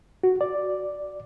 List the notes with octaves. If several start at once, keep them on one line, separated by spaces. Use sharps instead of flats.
F#4
D5